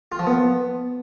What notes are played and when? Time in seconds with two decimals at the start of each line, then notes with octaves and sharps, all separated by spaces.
0.12 F4
0.19 F3
0.27 B3